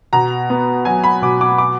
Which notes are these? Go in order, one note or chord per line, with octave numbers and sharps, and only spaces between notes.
B2 A#5
B3
F#3 G#5
B5
B2 D6
D6
D6